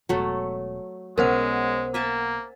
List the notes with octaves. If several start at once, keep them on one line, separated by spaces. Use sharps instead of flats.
E1 F#3 A3
B1 G#3 B3 C#4 A#4 C5 F#5
A#3 E5 G#5 A5